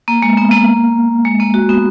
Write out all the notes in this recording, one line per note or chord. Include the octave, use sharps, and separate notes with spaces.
A#3
G#3
B3
A#3
G#3
A#3
F#4
B3